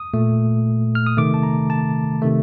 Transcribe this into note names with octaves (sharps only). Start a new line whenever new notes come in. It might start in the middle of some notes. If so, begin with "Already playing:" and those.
Already playing: D#6
A#2 A3
F6
D#6
C3 D#3 A3 D6
A5
A#5
A5
C3 D#3 A3